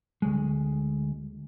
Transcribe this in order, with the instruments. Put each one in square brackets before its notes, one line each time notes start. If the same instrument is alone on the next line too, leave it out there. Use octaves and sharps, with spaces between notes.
[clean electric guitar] D2 G#3